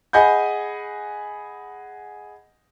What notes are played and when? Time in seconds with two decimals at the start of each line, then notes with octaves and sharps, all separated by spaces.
0.13 G#4 D#5 F#5 G#5 B5 G6